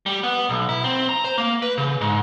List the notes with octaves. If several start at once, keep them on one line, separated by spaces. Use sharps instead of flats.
G3
B3
B1
E4
C4
A#5
C5
A#3
B4
C#3
G#2